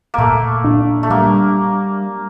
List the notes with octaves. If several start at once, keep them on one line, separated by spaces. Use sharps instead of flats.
A#2 A3 A#3
D4
A3
G3 A#3